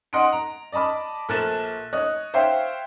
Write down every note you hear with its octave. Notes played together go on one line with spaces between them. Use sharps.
D#5 F#5 C6 D#6 D7
A#5
D5 D#5 A5 B5 D6
A#1 A4 A#4 F#6 A6 E7
C#5 D#5 F#6
C5 C#5 E5 F5 G5